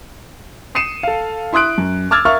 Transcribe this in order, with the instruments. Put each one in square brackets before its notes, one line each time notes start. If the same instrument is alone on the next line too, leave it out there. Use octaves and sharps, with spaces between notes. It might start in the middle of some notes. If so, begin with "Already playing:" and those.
[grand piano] D#6 C7 C#7 D#7 E7
A4 F5
E4 C6 D#6 F#6 D7
F#2
D6 E6 F6 G#6 A6
A#4 E5 F5 C#6 F6